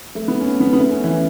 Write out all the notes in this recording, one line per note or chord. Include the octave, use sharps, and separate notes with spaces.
A3
B3
C#4
B3
B3
A3
C#4
E3